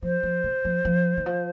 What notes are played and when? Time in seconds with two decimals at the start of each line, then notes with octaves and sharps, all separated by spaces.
0.02 F3 C5
0.23 F3
0.44 C#3
0.65 F3
0.85 F3
1.17 D#3
1.26 F3